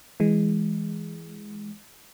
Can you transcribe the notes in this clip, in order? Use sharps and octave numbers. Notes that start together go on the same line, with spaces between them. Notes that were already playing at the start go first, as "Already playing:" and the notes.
E3 G#3